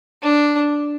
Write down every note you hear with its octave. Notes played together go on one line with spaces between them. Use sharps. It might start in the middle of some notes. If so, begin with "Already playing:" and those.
D4